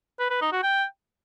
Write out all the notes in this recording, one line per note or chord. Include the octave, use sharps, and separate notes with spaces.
B4
B4
D#4
F#4
G5